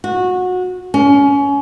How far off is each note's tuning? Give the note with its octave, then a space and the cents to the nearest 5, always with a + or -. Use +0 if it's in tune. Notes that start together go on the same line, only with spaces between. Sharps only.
F#4 -20
C#4 +25